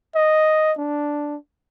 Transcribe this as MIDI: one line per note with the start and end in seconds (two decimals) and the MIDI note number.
0.15 0.73 75
0.78 1.36 62